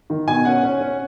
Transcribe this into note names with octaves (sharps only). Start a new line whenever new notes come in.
D#3
B2 G#5
C#4 F#5
C#4
C#4